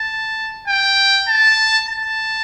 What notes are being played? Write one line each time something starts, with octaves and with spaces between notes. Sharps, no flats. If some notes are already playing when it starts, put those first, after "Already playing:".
Already playing: A5
G5
A5
A5